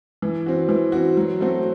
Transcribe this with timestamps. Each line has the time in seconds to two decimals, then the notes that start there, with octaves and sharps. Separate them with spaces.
0.22 E3
0.46 C4 F#4
0.69 E3
0.92 C4 F#4
1.17 F#3
1.40 A3 C4 F#4